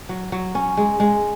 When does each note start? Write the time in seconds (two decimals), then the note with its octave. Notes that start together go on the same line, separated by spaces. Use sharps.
0.09 F#3
0.32 F#3
0.55 C#4
0.77 G#3
1.00 G#3